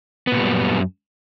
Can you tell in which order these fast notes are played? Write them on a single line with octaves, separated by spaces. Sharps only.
B3 A#2 G3 F#2